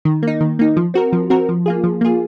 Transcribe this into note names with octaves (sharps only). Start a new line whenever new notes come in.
D#3
A#3 D#4
D#3
A#3 D#4
F3
C4 F#4 A#4
F3
C4 F#4 A#4
F3
A#3 F4 G#4
F3
A#3 F4 G#4